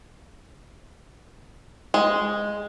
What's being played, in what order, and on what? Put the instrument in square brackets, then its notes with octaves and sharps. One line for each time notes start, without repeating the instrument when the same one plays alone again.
[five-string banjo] G#3